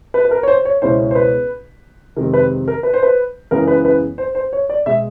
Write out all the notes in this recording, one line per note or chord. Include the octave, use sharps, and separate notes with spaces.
B4
B4
A#4
C#5
C5
C#5
C#2 B2 G#3 C#4 E4 C5
C5
B4
F2 C3 D#3 G#3 C4 A#4
B4
A#4
B4
C5
B4
F#2 C#3 E3 G#3 B3 A#4
B4
B4
C5
C5
C#5
D5
B2 G#3 E5